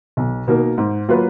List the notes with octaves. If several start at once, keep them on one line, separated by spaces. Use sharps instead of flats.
B1
B2 A#3 D#4 A#4
G#2
F#3 A#3 F4 B4